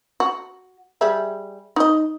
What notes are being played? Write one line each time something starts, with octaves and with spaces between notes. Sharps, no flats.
F#4
G3 G#4 E5
D#4 D#5